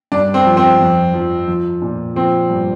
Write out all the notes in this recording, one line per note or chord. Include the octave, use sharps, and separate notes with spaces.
G2 D4
C4
F3
C4
F2
F3
F3
A#2
F3 C4
G2